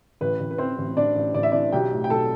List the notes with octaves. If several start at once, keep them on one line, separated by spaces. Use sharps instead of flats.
A1 B4
A1
B4
E3 C4 C5
A1
A1 D4 D5
A1
A1 D5
E5
E3 D4 D5
B1 G4 G5
A2
G5
B1 A4 A5